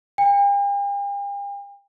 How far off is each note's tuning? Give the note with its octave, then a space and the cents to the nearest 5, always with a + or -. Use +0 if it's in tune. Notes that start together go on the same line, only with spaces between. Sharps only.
G5 +45